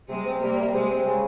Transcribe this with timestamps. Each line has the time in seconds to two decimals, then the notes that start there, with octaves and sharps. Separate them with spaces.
0.09 C3 G#3
0.25 C4
0.41 G3 A#3
0.58 C3
0.74 C3 G#3
0.90 C4
1.05 C#3